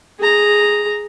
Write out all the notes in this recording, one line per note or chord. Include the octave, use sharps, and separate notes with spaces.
G#4 A#5